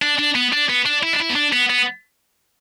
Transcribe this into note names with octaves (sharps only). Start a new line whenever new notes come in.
D4
D4
B3
D4
B3
D4
E4
D4
E4
B3
D4
B3
B3